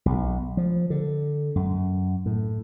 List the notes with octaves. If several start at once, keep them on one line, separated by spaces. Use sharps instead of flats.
B1
F3
D3
F#2
A2